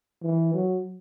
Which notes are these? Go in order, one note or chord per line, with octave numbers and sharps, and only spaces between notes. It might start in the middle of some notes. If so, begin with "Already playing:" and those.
E3
F#3